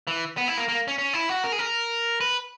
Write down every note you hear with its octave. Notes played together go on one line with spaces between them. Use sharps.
E3
B3
E4
A#3
A#3
C#4
C#4
E4
F#4
A#4
G#4
A#4
B4